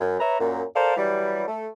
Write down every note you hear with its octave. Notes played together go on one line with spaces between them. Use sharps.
F#2
B4 C#5 E5 A#5
F#2 A#2
A4 A#4 C5 D5 F5
E3 F#3 G3
A3